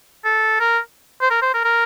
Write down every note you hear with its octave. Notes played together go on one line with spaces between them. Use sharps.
A4
A#4
C5
A#4
C5
A#4
A#4